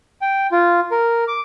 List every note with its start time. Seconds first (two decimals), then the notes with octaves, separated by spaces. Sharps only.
0.21 G5
0.52 F4
0.91 A#4
1.28 D6